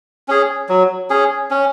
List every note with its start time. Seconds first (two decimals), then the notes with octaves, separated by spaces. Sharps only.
0.28 C#4 G#4
0.69 F#3
1.10 C#4 G#4
1.51 C#4